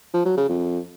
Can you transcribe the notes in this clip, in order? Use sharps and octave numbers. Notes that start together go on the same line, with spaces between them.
F3
F#3
C#3
F2